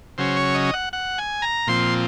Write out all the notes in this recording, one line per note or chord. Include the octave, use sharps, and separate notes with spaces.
C#3 F#3 C#4 C5
C#5
D#5
F#5
F#5
G#5
A#5
A#2 F3 C4 C6